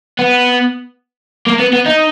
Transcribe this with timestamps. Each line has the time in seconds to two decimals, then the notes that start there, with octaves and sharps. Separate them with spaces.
0.19 B3
1.47 A#3
1.60 B3
1.73 B3
1.86 D#4